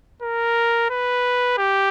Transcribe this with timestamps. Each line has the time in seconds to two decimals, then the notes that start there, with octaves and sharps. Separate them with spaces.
0.22 A#4
0.90 B4
1.58 G4